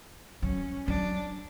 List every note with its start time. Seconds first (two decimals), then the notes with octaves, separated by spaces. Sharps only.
0.42 F#3 C#4
0.87 F#3 D4